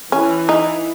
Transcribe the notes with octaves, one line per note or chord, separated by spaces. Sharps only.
E3 C#4
D#4